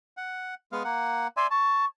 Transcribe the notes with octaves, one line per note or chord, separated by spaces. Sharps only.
F#5
G#3 B3 F5
A#3 F#5
D5 E5 G#5 C6
A5 C#6